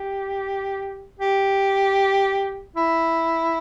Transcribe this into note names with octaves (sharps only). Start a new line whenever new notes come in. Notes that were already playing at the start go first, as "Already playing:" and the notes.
Already playing: G4
G4
E4